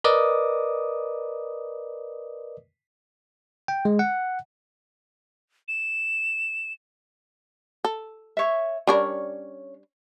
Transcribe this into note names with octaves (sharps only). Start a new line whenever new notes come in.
A#4 B4 D5 D#5 D6 D#6
G5
G#3
F#5
E7
A4
C#5 E5
G3 C#4 D4 A#4 C#5